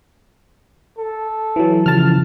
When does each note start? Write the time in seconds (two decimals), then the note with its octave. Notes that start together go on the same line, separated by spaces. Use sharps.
0.99 A4
1.56 E3 F#3
1.86 C#3 E3 F3 A5 F6